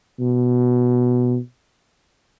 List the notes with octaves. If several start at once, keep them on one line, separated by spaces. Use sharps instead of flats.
B2